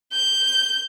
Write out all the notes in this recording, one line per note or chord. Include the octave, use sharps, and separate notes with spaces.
G6